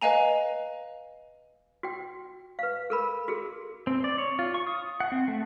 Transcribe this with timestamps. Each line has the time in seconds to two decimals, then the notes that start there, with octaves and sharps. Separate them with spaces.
0.01 B4 D#5 F5 G#5 A#5
1.83 F#4 G5
2.59 B4 F5
2.90 A4 A#4 B5
3.28 F#4 G#4 A4
3.87 C4
4.04 D5
4.18 C#5
4.39 F4
4.54 C#6
4.67 D#6
5.00 F#5
5.12 C4
5.28 A3